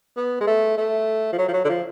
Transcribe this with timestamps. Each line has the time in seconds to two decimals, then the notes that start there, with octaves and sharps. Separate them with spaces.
0.17 B3
0.41 G#3
0.47 A3
0.77 A3
1.33 F3
1.38 F#3
1.48 F3
1.53 F#3
1.65 D3
1.69 F3